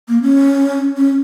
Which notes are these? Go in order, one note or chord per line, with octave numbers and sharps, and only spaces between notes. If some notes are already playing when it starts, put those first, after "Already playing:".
A#3
C#4
C#4